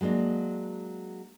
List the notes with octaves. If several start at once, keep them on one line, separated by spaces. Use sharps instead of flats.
F#3 G#3 A#3 D4 F#4